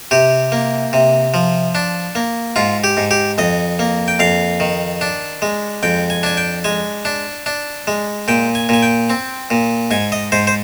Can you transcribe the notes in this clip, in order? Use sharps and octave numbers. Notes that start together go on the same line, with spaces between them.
C3 G4
A#3
C3
F3
D4
A#3
G#2 F4
G4
G#2
G4
F2 D#5
A#3
G5
F2 F5
D#3
D4
G#3
F2 G5
G#5
D4 G#5
G5
G#3 G#5
D4
D4
G#3
A#2 G5
G#5
A#2 G#5
G5
C4
A#2
G#2 G#5
D#5
G#2 C5
C5